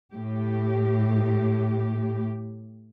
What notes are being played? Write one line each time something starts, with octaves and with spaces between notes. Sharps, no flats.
A2 G4